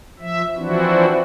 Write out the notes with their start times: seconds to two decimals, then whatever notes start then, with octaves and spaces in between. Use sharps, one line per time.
0.20 F3 E5
0.56 E3 F3 C4 D4 E4 F#4